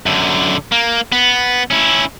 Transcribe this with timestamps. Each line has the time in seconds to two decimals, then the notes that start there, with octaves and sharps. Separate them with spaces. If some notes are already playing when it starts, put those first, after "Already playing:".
0.06 F#2 D3
0.72 A#3
1.12 B3
1.71 C#4 E4